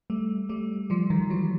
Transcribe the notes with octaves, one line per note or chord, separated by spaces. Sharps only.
G3 A3
G3 A3
F3 G3
D#3 F3
E3 F#3